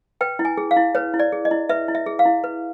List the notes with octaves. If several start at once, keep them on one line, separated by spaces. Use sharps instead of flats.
B4 G5
E4
G#5
G#4
F5
E4
B4 C#5
E4
D5
G#4
D#5
E4
B4 E5
E4
E5
G#4
F5
E4
B4